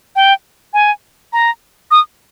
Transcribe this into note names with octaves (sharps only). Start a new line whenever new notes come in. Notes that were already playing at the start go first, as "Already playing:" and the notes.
G5
G#5
A#5
D#6